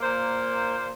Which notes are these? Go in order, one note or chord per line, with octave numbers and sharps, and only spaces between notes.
A#2 A#3 C5